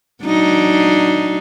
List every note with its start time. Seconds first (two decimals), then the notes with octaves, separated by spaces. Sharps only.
0.25 F#3 D4 D#4